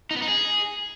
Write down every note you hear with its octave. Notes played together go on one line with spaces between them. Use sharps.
D#4
B3
D#4
G#4